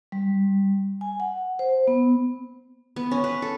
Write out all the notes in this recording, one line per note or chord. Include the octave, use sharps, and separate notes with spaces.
G3
G#5
F#5
C5
B3
B3
C#4
B4
A4